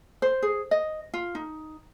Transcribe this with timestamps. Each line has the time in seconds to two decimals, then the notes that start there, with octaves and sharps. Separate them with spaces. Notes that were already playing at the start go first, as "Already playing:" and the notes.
0.22 C5
0.42 G#4
0.71 D#5
1.14 F4
1.35 D#4